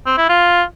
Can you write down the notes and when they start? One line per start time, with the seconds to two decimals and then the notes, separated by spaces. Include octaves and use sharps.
0.06 C4
0.18 E4
0.29 F4